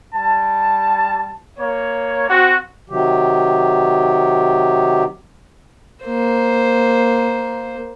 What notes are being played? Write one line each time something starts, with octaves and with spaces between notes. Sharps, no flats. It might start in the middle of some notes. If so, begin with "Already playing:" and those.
G3 A5
A#3 C#5
C4 F#4
C3 D#3 F#3 G4
A#3 C5